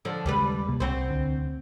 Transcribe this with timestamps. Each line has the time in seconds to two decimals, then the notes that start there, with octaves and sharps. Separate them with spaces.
0.05 D3 F3
0.26 D#2 C#3 G3 G#3 G4 B4
0.68 C3 A#3
0.80 C2 C4 F#4 C5
1.10 D2 D3